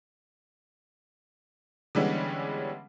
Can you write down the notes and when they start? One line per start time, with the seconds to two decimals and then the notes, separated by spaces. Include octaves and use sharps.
1.95 D3 E3 G3 G#3 B3 C#4